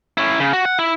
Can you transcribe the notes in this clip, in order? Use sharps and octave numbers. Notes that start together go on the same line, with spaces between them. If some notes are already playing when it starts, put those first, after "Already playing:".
C#4 E4
C#3
F#4
F#5
E4